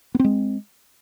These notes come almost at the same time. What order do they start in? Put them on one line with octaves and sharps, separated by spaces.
B3 C4 G#3